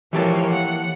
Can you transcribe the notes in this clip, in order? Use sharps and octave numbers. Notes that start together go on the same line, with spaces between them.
E3 F3 A#3 G4 A4 C#5
F#5